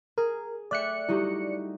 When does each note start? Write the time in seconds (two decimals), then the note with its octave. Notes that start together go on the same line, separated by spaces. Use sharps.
0.18 G#4 A#4
0.71 A3 D5 E5 G5 F#6 C#7
1.09 G3 D#4 E4 F#4 G4